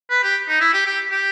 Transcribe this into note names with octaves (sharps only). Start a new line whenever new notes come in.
B4
G4
D#4
E4
G4
G4
G4